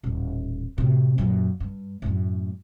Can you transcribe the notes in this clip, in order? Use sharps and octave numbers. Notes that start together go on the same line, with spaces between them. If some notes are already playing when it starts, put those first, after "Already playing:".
D#1 A1
A2 C3
F#2 A#2
G2
F#2 A2